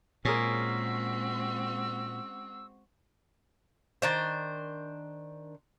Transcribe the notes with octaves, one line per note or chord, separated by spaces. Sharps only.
A#2 G#3 C4 C#4 F#4 G#4 A#4 E6
D#3 D4 C5